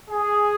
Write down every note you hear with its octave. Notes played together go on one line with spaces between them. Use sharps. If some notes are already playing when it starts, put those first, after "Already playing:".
G#4